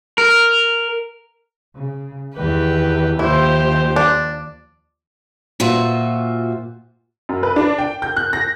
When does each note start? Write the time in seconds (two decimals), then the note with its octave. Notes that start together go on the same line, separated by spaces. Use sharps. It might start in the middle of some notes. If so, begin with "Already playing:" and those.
0.18 A#4
1.75 C#3
2.34 E2 D#3 G4 B4
3.19 D#2 F3 E4 G4 C5
3.96 D4
5.60 A#2 F4 F#4 C5 E5
7.29 F#2
7.43 B4
7.56 D4
7.79 G5
8.02 G6
8.16 F#6
8.33 A#6